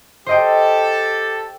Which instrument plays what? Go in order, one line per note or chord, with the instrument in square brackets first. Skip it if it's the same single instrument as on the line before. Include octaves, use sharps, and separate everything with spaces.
[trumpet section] G4 A4 [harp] C5 D#5 G5